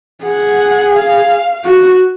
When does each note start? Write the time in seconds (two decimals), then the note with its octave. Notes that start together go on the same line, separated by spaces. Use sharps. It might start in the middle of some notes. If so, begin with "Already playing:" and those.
0.24 G#4 F#5
0.95 F5
1.65 F#4